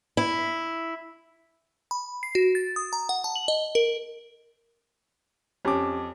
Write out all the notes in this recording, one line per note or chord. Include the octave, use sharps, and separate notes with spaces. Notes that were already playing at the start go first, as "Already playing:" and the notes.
E4
B5
C7
F#4
A6
D#6
A#5
F#5
A5
F#7
D#5
A#4
F2 C#4 G4 D6